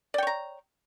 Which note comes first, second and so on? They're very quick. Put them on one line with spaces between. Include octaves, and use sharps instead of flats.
D5 G5 C#5 A#5